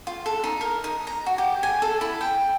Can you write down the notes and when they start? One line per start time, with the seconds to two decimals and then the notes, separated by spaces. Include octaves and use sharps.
0.07 F4
0.26 A4
0.44 D#4
0.61 A#4
0.84 D#4
1.07 A#5
1.26 F#4
1.38 G4
1.63 G#5
1.82 A4
2.01 E4
2.21 G5